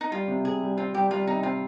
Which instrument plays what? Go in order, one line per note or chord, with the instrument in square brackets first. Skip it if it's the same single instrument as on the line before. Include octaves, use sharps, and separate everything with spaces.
[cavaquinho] D#4
[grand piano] G3 [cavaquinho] F4
[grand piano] C3
[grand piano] C3 [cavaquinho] G#4
[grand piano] G3
[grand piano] C4 [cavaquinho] F4
[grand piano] G3 [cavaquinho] G4
[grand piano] G3 [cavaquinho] F4
[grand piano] C3 [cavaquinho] D#4
[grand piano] C4 [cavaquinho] F4